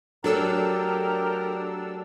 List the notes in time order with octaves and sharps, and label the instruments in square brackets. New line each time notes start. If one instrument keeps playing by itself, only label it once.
[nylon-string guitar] F#3 A3 [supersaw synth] D4 A4 E6 [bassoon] G4 [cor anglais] A#4